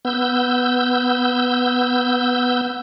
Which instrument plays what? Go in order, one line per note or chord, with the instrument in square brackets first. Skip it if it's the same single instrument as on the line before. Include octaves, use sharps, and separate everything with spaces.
[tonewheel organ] B3 E6 G6